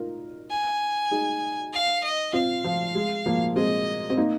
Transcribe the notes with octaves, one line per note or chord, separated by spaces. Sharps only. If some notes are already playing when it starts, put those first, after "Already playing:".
Already playing: D#4 F4 A#4
G#5
D#4 G#4
F5
D#5
C4 F4 F5
F3
G#3
F3 A#3
G#3 C4 D#5
C4
A#3 D#4